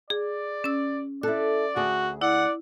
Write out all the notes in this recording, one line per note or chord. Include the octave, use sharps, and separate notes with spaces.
G#4 D5
C#4 E6
E4 A4 D5 F#6
D2 F#4 G#4
E4 D5 F#5